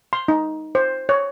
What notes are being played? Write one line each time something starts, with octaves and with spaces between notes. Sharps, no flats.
C6
D#4
C5
C#5